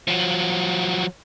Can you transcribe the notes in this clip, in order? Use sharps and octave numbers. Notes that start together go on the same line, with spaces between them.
F3 F#3